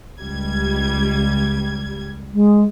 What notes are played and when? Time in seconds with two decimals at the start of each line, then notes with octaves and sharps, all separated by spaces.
0.20 C#2 G3 G#6
2.33 G#3